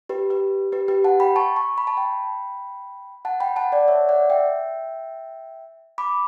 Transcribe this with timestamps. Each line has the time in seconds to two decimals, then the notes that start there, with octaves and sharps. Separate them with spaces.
0.09 G4 B4
0.30 G4 B4
0.72 G4 B4
0.88 G4 B4
1.04 F#5 A5
1.20 G5 B5
1.36 A5 C#6
1.56 A5 C#6
1.78 B5
1.87 A5
1.97 G5 B5
3.25 F#5 A5
3.40 G5 B5
3.56 F#5 A5
3.72 D5 F#5
3.88 C#5 E5
4.09 D5 F#5
4.30 E5 G5
5.98 B5 D6